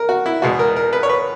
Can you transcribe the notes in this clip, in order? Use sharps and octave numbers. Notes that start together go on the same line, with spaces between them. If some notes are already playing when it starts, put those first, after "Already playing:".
Already playing: A#4
F#4
E4
E2 B2 G#3 F#4
A#4
A#4
B4
C#5
B4